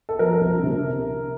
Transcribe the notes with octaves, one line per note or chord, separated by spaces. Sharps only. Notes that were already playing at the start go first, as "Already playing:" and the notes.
A4
F3 A#4
C2
C3